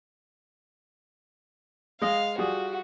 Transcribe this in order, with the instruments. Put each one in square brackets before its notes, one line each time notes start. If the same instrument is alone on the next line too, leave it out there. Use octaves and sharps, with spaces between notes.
[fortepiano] G#3 D#5 [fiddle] F5
[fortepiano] G3 F4 G#4 [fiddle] F#4